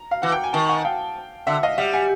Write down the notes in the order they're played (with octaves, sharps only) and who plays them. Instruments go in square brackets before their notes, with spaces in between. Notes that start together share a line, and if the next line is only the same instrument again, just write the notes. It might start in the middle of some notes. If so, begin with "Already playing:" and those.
Already playing: [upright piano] A#5
F5
[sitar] E3 [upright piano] F#5
[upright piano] G5
G#5
[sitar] D#3 [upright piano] G5 A5
[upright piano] F#5 G#5
F5 G5
[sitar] D3 [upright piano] E5 F#5
[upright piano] D#5 F5
[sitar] G3 [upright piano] E5 F#5
[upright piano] F#5 G#5